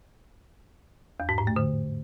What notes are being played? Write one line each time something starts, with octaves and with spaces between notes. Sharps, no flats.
E2
G#2
A2
A3
D3